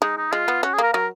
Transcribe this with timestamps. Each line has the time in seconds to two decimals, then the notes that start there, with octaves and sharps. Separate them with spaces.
0.02 G#3 D#4
0.17 D#4
0.32 G#3 F4
0.48 B3
0.63 C#4 F#4
0.73 G#4
0.78 A#3 A#4
0.93 F#3 A#4